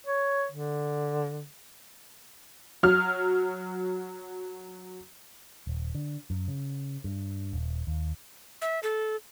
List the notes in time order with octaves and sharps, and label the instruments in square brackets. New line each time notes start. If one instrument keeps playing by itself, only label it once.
[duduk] C#5
D3
[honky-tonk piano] F#3 F6
[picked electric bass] D#1
D3
F#2
C#3
G2
D#1
D#2
[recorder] E5
A4